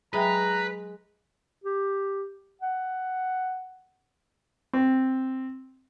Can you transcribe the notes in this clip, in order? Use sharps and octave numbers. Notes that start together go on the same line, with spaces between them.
F#3 G#3 B4 E5 G5 A#5
G4
F#5
C4